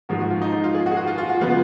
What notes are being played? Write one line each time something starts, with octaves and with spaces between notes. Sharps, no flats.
G#2 F3 G#3 F#4
F#4
F4
D#4
D#4
F4
G#4
F#4
G#4
F#4
F4
F4
F#4
C#3 F3 G#3 B3 F4